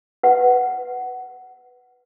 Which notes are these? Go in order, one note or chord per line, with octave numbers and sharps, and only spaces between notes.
B4 F#5